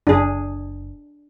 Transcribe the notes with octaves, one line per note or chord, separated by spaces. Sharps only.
F#1 D4 G#4